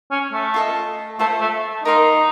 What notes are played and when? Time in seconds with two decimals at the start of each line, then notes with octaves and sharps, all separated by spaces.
0.11 C#4
0.33 A3
0.54 F4 A4 D#5
1.19 A3 F4 A4 C5
1.41 A3
1.84 D#4 A#4 F5 C6